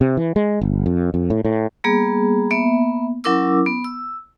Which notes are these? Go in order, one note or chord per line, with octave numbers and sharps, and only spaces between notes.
C3
E3
G#3
G1
F2
F2
A2
A2
G3 A#3 B3 G#4
A#3 B3 E5
F#3 C#4 E4 A#4 D6 E6
B3
E6